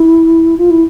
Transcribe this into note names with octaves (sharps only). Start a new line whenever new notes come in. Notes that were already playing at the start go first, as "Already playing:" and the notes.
Already playing: E4
F4
E4